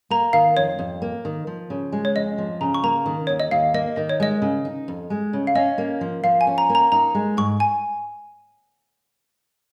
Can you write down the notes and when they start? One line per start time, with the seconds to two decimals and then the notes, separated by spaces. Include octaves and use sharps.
0.10 A#3 A#5
0.33 D#3 F5
0.57 F2 C#5
0.79 F2
1.02 A#3
1.25 D#3
1.47 F3
1.70 C#3
1.92 G#3
2.05 C#5
2.15 F2 D#5
2.38 F3
2.61 C#3 A#5
2.74 C#6
2.83 A#3 A#5
3.06 D#3
3.27 D#2 C#5
3.40 D#5
3.51 D#2 F5
3.74 A#3 D#5
3.96 D#3 D#5
4.09 C#5
4.20 G#3 D#5
4.42 C#3
4.65 D#4
4.88 F2
5.10 G#3
5.33 C#3
5.47 F5
5.55 C#4 D#5
5.78 A#3
6.01 F3
6.24 F3 F5
6.41 G#5
6.47 C#4
6.58 A#5
6.69 A#3
6.75 A#5
6.92 D#4 A#5
7.15 G#3
7.37 G#2 C#6
7.60 G#5